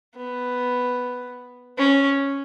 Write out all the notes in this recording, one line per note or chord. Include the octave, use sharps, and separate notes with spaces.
B3
C#4